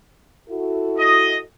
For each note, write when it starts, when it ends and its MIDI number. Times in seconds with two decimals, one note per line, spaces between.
0.49 1.41 64
0.49 1.41 66
0.49 1.41 69
0.98 1.36 75